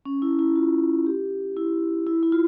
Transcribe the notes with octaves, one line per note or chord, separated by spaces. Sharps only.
C#4
E4
E4
F4
G4
E4
E4
E4
F4